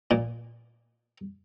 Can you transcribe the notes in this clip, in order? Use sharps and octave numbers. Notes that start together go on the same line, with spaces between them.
A#2